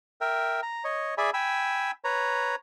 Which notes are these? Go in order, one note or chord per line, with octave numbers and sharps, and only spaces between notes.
A#4 E5 G5
A#5
C#5 D#5
G#4 D5 E5 G#5 B5
G5 G#5 B5 E6
B4 C#5 A#5